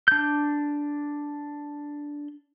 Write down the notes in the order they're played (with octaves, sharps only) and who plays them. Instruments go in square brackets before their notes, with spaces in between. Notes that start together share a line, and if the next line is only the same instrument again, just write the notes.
[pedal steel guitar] D4 G6